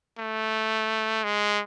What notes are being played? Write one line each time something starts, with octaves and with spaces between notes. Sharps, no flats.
A3
G#3